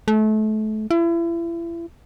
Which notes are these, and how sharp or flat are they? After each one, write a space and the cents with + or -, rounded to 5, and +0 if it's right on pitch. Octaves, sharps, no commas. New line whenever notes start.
A3 -30
E4 +35